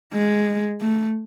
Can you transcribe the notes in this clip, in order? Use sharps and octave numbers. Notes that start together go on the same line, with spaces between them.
G#3
A3